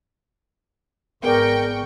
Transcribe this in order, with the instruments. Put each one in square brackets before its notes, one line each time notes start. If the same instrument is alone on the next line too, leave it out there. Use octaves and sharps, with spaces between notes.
[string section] G#1 G5 C#6 [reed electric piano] B3 G#4 D5 [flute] A#4